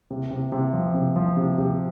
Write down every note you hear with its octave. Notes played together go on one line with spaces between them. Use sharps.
C3
C3
C3
F3
C3
F3
C3
C3